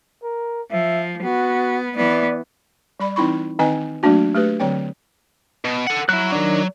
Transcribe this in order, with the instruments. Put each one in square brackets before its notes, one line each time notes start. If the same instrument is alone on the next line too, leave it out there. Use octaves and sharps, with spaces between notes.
[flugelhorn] A#4
[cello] F3 [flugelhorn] E5
[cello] B3 [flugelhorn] F#4
[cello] E3 B3 [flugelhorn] D5
[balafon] G3 D5 B5
E3 C4 D#4 E4 B5 C#6
D#3 C4 D#4 B4 D#5 G#5
F#3 A3 A#3 D4 F#4
A3 G4 B4
D3 F#3 C4 C#5 G5
[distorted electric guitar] B2
A4 F#5
[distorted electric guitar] F#3 [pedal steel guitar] E4 F#6
[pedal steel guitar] D#3 D4